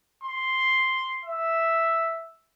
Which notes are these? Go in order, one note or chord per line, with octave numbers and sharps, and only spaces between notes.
C6
E5